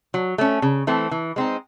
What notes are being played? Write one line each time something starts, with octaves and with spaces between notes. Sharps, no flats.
F#3
A3 C#4
C#3
E3 A3 C4
E3
G#3 C4 D#4